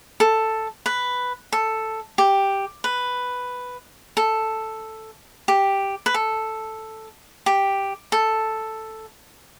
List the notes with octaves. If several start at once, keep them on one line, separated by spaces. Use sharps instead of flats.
A4
B4
A4
G4
B4
A4
G4
B4
A4
G4
A4